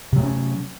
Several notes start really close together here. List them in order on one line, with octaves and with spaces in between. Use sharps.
C3 F#3 A3 C#4